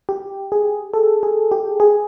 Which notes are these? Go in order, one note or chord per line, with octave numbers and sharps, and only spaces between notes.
G4
G#4
A4
G#4
G4
G#4